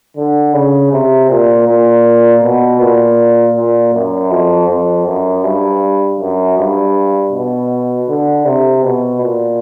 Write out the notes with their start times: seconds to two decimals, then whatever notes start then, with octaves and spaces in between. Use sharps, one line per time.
0.17 D3
0.54 C#3
0.92 C3
1.30 A#2
1.68 A#2
2.43 B2
2.80 A#2
3.56 A#2
3.94 F#2
4.31 F2
4.69 F2
5.07 F#2
5.44 G2
6.20 F#2
6.58 G2
7.32 B2
8.09 D3
8.46 C3
8.83 B2
9.21 A#2